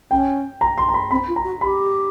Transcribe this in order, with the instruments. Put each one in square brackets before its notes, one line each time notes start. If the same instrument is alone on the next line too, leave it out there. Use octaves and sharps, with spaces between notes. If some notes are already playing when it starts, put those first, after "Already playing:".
[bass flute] C#4 [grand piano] G5
[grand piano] A#5
C6
A#5
B5
[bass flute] C4 [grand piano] B5
[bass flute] F4
[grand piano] A#5
[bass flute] F#4
[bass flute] G4 [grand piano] B5